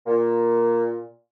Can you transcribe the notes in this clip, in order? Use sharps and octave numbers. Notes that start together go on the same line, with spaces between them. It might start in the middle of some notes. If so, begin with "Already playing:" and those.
A#2